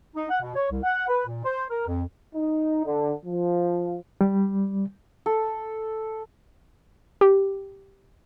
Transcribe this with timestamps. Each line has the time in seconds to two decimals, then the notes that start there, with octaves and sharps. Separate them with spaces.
0.15 D#4
0.29 F#5
0.41 B2
0.55 C#5
0.70 C2
0.83 F#5
1.08 B4
1.26 A#2
1.44 C5
1.70 A#4
1.87 F2
2.35 D#4
2.86 D3
3.25 F3
4.21 G3
5.26 A4
7.21 G4